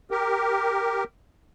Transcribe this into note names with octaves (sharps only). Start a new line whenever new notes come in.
G4 A#4